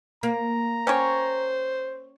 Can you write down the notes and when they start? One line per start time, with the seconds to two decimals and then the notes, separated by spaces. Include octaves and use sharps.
0.23 A#3 A#5
0.87 C#4 G4 C5 C#5